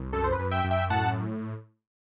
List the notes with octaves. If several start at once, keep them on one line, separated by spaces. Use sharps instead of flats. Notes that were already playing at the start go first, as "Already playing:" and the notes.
Already playing: C2
F#2 A4
C5
B4
F#2
E5 G5
F#2
E5 G5
A2 F#5 A5